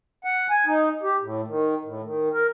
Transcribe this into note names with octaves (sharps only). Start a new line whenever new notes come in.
F#5
G#5
D#4
G4
A2
D#3
A2
D#3
A#4